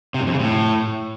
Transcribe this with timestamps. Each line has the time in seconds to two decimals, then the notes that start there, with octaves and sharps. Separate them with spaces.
0.14 C3
0.21 F#2
0.27 F2
0.33 C#3
0.40 A2